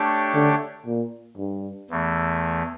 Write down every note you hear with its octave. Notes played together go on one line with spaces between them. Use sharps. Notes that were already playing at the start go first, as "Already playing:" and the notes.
Already playing: A3 D4 G4 C#5
D3
A#2
G2
E2 E3 A3